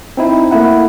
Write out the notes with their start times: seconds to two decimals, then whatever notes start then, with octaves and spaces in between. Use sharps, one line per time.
0.17 C4 D#4 E4
0.51 A3 A#3 E4 F#5